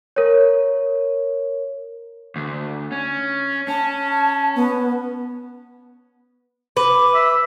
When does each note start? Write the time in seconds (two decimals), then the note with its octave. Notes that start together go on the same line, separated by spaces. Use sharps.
0.16 A#4 C#5
2.36 D2
2.92 C#4
3.68 C#4 A5
4.56 B3
6.77 B4 D6
7.15 E5